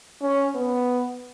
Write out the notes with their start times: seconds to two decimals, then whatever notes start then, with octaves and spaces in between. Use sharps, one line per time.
0.22 C#4
0.55 B3